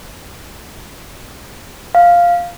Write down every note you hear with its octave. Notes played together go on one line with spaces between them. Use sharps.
F5